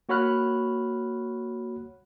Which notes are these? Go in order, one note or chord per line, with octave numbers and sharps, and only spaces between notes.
A#3 F#4 C#5 B5 F6 F#6